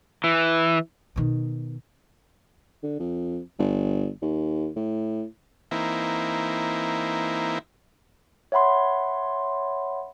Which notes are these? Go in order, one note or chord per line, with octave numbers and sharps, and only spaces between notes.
E3
B2 D#3
D3
F2
G1
D#2
A2
E3 A#3 C4 D#4 E4
C#5 E5 F#5 B5 C6